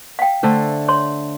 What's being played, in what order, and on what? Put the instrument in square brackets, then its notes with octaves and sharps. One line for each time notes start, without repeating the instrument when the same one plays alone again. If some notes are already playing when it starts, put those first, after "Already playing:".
[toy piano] F5 G5
[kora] D3 A3 C5
[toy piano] C#5 C6